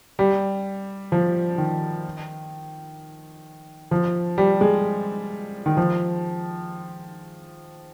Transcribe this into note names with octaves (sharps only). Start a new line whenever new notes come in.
G3
F3
D#3
F3
G3
G#3
D#3
F3